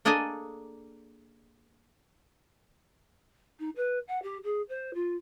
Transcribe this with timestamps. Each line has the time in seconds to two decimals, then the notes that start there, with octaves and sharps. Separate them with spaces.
0.05 A#3 D4 G#4 A4 D#5 G#5
3.59 D#4
3.76 B4
4.07 F#5
4.22 G4
4.43 G#4
4.69 C5
4.94 F4